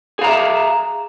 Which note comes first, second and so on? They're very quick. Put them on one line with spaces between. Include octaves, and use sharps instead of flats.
G#4 F5 A#5 E5